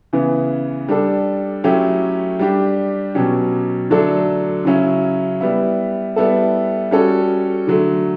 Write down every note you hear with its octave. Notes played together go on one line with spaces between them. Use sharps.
C#3 E3 B3
G3 D4 A4
F#3 A3 C#4 E4 G4
G3 D4 G4
B2 F#3 C#4 G4
D3 F#3 A3 D4 A4
C#3 F#3 C#4 E4
G3 B3 E4
G3 B3 E4 A4
G3 C#4 F#4 A4
D3 F#3 A3